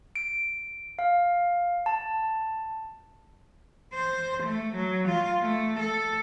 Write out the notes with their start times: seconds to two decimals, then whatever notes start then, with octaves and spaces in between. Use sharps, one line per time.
0.16 D7
0.99 F5
1.86 A5
3.94 C5
4.44 A3
4.76 F#3
5.08 F4
5.42 A3
5.80 A4